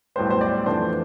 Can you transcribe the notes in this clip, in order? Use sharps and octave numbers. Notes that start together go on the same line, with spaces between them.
B1 A2 G3 B3 C5
C5
D5
F2 E3 A3 D4 C5